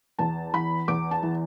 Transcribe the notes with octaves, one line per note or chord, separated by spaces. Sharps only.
E2 A5
E3 B5
E2 D6
A5
E3